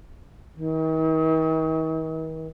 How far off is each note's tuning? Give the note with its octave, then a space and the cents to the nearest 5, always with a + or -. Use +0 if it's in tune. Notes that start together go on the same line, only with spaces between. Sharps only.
D#3 +45